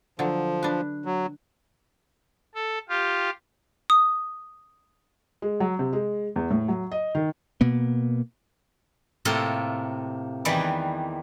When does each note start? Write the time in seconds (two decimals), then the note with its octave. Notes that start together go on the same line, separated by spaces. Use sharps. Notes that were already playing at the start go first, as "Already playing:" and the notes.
0.19 D3 F3 F#3
0.63 D4 B4
1.05 F#3
2.55 A4
2.89 F4 G4
3.90 D#6
5.42 G#3
5.60 F#3
5.79 C3
5.93 G#3
6.36 E2
6.51 A2
6.68 F#3
6.92 D#5
7.15 D#3
7.61 B2 A#3 B3
9.25 A2 C3 A#3 F4 A4 C6
10.45 E2 D#3 E3 G3 B4 D5